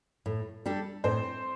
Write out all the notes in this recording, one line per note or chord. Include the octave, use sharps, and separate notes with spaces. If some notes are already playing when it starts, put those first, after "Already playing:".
A2
G3 D4 A4
A2 C4 C5